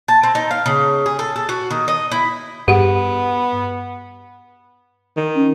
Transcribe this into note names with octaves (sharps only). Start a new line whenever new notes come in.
A5
C4
D#4
F5
C#3
G#4
A4
A4
F#4
D#3
D#5
E4
G2 B3 G4 G#4 F#5
D#3
C#4